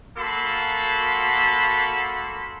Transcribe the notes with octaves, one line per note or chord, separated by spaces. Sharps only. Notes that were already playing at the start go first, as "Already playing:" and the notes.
A#3 F#4 A4 B5 C6